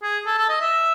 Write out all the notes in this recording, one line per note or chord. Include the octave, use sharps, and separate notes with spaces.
G#4
A4
A4
D#5
E5